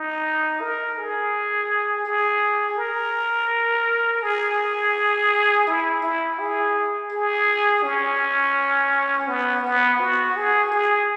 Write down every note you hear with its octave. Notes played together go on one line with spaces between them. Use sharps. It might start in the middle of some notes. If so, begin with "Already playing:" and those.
Already playing: D#4
A#4
G#4
G#4
A#4
G#4
E4
E4
G#4
G#4
C#4
B3
B3
F#4
G#4
G#4